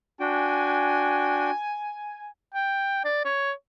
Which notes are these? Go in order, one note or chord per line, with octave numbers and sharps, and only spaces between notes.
D4 F#4 G5 G#5
G5
D5
C#5